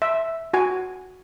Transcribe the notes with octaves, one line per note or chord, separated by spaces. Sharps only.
E5
F#4 G#5